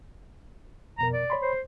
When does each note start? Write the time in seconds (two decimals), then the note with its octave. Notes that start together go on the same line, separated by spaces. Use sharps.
0.99 F2 B2 A#4 A#5
1.13 D5
1.30 C#5 B5 C6
1.42 C5